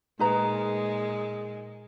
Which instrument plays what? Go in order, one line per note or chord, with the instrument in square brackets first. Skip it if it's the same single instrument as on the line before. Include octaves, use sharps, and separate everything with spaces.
[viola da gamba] A#2 G#3 [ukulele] D#4 B4 A#5